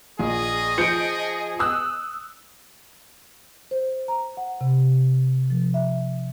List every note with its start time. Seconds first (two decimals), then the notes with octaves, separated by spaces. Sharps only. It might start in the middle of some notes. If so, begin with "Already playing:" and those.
0.19 A#1 G#4 D#5
0.78 F3 G6 C#7 D7
1.59 D#6 E6 F#6
3.71 C5
4.08 A#5
4.37 F#5
4.61 C3
5.50 F3
5.74 E5